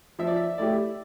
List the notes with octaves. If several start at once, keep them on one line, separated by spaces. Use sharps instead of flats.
F3 E5
D5
E5
A3 E4 G4 D5